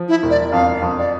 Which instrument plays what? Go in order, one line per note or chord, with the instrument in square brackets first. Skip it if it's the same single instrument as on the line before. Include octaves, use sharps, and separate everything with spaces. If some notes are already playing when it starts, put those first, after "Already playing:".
Already playing: [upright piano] F3
[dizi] E4
[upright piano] E1
[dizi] D5
[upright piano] F2 [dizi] F5
[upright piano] F2
[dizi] D5